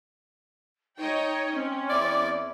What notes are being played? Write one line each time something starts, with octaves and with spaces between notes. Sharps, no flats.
D#4 C#5 D#5 G5
C4 C#4
E2 E4 D5